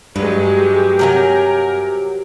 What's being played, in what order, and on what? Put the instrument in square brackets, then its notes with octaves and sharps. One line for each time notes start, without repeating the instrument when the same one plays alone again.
[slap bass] G2 [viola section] F#3 G#3 [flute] G4 [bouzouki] B4
[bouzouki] C3 F#3 G#5 [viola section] A#4